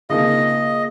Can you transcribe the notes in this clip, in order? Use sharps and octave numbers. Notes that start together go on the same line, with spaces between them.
C#3 F3 A#3 D#4 D#5